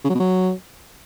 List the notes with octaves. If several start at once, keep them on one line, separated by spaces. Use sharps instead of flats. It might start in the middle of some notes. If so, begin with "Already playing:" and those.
C#3
F#3
B2
F#3